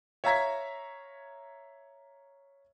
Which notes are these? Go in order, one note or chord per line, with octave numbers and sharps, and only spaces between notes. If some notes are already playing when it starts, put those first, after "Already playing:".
C#5 E5 F5 A#5 G#6 B6